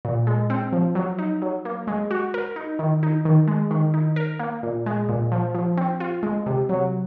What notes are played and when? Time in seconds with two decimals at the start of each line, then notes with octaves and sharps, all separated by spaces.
0.05 A#2
0.27 G#3
0.50 C4
0.73 F3
0.95 F#3
1.19 D#4
1.42 F#3
1.65 A#3
1.87 G#3
2.11 F#4
2.34 A#4
2.56 D#4
2.79 D#3
3.03 D#4
3.25 D#3
3.48 G#3
3.71 D#3
3.94 D#4
4.16 A#4
4.39 A#3
4.63 A#2
4.86 G#3
5.09 A#2
5.32 F3
5.55 F3
5.77 C4
6.00 F4
6.23 G#3
6.46 C3
6.69 F#3